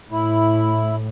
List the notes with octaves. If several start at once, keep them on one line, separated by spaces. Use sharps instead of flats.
A2 E4